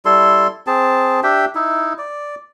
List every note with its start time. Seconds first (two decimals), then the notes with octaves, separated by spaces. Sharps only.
0.05 G3 E4 A4 C6
0.67 C4 G#4 A5
1.23 D4 G4 E5 G5
1.55 D#4 E4
1.98 D5